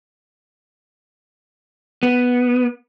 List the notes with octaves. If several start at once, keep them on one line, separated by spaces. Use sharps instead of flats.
B3